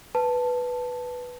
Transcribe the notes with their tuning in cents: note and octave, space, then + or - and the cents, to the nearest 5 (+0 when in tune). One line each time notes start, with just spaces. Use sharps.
B4 +0 A5 +0